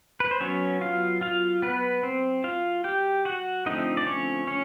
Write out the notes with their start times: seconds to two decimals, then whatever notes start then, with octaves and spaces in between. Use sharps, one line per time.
0.20 B4
0.31 C5
0.41 F#3 B3 C#4 C#5
0.81 F4 F5
1.21 F4 F5
1.62 B3 B4
2.03 C4 C5
2.44 F4 F5
2.84 G4 G5
3.25 F#4 F#5
3.66 D3 F3 A3 C4 D#4 D#5
3.97 D5
4.07 C#4 C#5
4.47 C#4 C#5